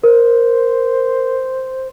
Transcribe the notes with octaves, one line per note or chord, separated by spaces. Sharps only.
A#4 C5